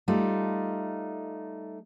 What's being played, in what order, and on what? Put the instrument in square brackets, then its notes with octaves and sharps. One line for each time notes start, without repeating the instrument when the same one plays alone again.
[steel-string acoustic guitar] G3 A3 D#4 F4